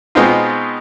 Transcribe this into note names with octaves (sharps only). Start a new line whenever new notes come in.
B2 G#3 B3 C4 D#4 F4